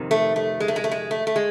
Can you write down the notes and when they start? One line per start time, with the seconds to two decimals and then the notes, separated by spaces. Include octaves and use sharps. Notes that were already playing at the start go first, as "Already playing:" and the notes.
Already playing: F2 C3 D#3
0.11 A3
0.36 A3
0.60 G#3
0.68 A3
0.76 G#3
0.84 A3
0.91 G#3
1.11 A3
1.27 A3
1.36 G#3